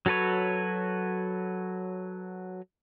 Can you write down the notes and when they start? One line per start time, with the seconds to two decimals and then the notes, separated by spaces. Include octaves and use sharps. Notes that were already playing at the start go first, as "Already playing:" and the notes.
0.06 F#3 F#4 A4 B4 C#5